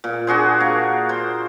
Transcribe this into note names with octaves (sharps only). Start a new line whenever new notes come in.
A#2
D4 F#4 G#4 C5
A#3
C5